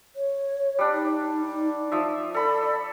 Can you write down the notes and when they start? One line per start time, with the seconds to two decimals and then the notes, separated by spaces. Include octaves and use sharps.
0.16 C#5
0.79 G3 D4
0.93 D#4
1.92 F3 E5
2.34 A4 D5 B5